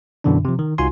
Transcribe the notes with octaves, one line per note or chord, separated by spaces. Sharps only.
F#2 B2 D3 E3 D4
C3 F3
D#3
C2 D#4 F4 F#4 G#5 C6